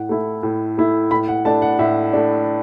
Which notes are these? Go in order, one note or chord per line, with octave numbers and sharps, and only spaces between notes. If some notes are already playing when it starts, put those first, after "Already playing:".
Already playing: A2 F#5
A3 E4
A2
A3 E4
A2 B5
F#5
A3 D4 A5
F#5
A2 E5
A3 D4